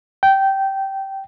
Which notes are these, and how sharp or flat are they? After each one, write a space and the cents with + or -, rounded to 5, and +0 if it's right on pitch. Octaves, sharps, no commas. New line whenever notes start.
G5 -15